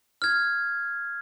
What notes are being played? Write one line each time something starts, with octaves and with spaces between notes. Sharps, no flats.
F6 G#6